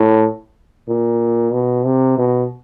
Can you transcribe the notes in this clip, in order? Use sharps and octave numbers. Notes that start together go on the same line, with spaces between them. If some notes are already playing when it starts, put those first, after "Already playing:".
Already playing: A2
A#2
B2
C3
B2